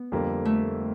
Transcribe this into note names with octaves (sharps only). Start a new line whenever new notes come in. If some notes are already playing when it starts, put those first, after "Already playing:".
Already playing: B3
F2 D3 G3 A#3
A3